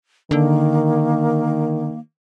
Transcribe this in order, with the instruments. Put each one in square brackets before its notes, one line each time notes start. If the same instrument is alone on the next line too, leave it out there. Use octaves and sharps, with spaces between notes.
[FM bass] D3 [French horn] D#3 [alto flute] A#3